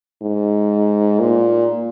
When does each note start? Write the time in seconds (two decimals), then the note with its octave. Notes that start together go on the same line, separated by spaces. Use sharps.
0.22 G#2
1.20 A#2